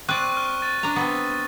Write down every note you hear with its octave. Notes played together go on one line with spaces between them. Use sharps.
C4 D5 C#6 F#6 D#7
F6
A6
D4 A#5
B3 C4